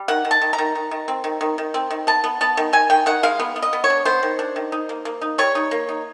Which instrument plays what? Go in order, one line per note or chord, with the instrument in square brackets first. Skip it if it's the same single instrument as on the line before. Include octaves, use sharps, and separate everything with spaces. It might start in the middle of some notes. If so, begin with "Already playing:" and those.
Already playing: [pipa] G3
D#3 F#5
D#3
A5
D#3
A#5
D#3
D#3
D#3
C4
D#3
D#3
D#3
C4
D#3
B3 A5
B3
B3 A5
D#3
D#3 G#5
D#3 G5
D#3 F#5
G#3 F5
B3
B3
D#5
B3
C#5
D4
B3 C5
D#3
D4
D#3
D#4
A#3
A#3
D#4
G3 C#5
D#4
A#3
D#4